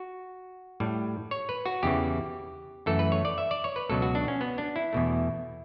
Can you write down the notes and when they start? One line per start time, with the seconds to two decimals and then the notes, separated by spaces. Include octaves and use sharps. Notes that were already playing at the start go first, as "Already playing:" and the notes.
Already playing: F#4
0.80 A2 G3
1.31 C#5
1.49 B4
1.66 F#4
1.83 E2 C#3 E3 G4
2.86 F#2 E3 A3 A4
2.99 B4
3.12 C#5
3.25 D5
3.38 E5
3.51 D5
3.64 C#5
3.76 B4
3.89 C#2 B2 F#3 A4
4.02 F#4
4.15 D4
4.28 C#4
4.41 B3
4.58 D4
4.76 E4
4.93 E2 B2 A3